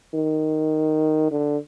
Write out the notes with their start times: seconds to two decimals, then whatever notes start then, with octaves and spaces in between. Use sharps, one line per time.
0.15 D#3
1.31 D3